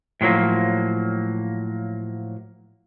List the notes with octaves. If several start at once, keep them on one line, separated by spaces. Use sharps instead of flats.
A2 F3 F#3 A#3